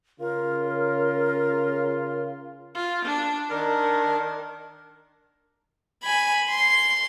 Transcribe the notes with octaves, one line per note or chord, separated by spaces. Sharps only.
C#3 F4 A#4
F4
D4
D#3 D4 A#4
G#5 B5
C6